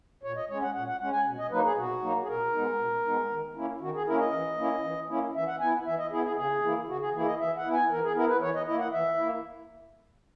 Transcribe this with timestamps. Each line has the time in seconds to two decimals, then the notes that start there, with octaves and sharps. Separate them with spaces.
0.23 A#2 C#5
0.36 D#5
0.49 G#3 C#4 C#5
0.62 F#5
0.74 A#2 F#5
0.88 F#5
1.00 G#3 C#4 F#5
1.12 G#5
1.26 B2
1.38 D#5
1.51 F#3 A#3 D#4 B4
1.64 G#4
1.76 B2 F#4
2.02 F#3 A#3 D#4
2.23 G#4
2.28 B2 A#4
2.53 G#3 B3 D#4
2.79 B2
3.05 G#3 B3 D#4
3.31 D#3
3.56 A#3 C#4 E4
3.81 D#3 F#4
3.94 G#4
4.07 A#3 C#4 E4 A#4
4.19 D#5
4.33 E3
4.57 A#3 C#4 E4
4.84 E3
5.09 A#3 C#4 E4
5.35 E3 E5
5.47 F#5
5.60 B3 E4 G#5
5.86 E3 E5
5.98 D#5
6.11 B3 E4 G#4
6.24 G#4
6.36 C#3 G#4
6.62 E3 A#3 E4
6.88 C#3 F#4
7.01 G#4
7.13 E3 A#3 E4 G#4
7.26 D#5
7.39 E3 E5
7.57 F#5
7.65 B3 E4
7.73 G#5
7.91 E3 A#4
8.04 G#4
8.15 B3 E4 A#4
8.28 B4
8.41 E3 C#5
8.55 D#5
8.66 A#3 E4 D#5
8.79 F#5
8.92 E3 E5
9.17 A#3 E4